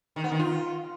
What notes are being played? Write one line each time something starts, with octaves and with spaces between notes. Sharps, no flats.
D#3
B3
D#3
F4